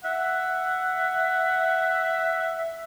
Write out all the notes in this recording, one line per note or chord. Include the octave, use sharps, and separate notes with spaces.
E5 F#5